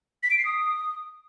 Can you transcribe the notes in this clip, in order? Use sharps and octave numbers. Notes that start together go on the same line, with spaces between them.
B6
D7
C7
D#6